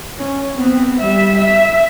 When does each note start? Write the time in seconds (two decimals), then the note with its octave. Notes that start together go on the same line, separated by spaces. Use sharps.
0.18 C#4
0.57 B3 C4
0.99 G3 E5
1.37 E5